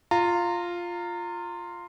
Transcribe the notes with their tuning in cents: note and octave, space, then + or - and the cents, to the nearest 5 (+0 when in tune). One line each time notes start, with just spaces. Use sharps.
F4 +0 A#5 -25